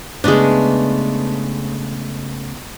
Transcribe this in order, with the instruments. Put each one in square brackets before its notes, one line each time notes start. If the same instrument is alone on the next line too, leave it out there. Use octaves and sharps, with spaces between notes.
[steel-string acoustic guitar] C#3 A3 B3 [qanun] G#3 D4